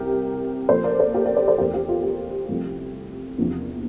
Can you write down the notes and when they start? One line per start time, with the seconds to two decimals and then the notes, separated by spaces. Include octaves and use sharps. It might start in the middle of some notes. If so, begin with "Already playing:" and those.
Already playing: C2 C3 G3 C4 G4 A#4
0.69 A#2 F3 A#3 A4 C5
0.84 A#4 D5
0.99 A4 C5
1.14 G4 A#4
1.26 A#4 D5
1.36 A4 C5
1.48 A4 C5
1.58 E2 E3 A3 G4 A#4
1.74 G4
1.89 F4
2.04 G4
2.49 C2 C3 F3 A3
3.38 E2 C3 F3 A#3 D4